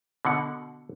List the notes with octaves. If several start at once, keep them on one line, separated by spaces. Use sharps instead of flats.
B2 D3 F#5